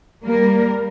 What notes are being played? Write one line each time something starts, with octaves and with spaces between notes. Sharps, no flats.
G3 A#3 A#4